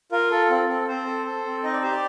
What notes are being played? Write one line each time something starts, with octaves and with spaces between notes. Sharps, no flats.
F4 A#4
A4
C4
C4 A4
C4 C5
A4
A4
C4
D#4 D#5
D5
G4 C5
D5